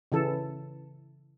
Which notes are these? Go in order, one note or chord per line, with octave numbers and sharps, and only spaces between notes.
C#3 E3 A4